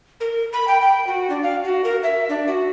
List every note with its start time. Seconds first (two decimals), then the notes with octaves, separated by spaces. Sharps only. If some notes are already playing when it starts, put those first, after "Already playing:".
0.20 A#4
0.53 B5
0.68 G5
0.81 G5
1.07 F#4
1.30 D4
1.43 F5
1.64 F#4
1.84 A#4
2.03 E5
2.29 D4
2.48 F#4